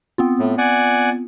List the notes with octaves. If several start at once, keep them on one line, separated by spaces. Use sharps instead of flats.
B3 C4 F4
A2
D5 F#5 G#5